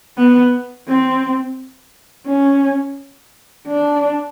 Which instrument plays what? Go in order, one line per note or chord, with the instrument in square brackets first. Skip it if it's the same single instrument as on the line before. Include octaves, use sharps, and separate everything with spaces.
[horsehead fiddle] B3
C4
C#4
D4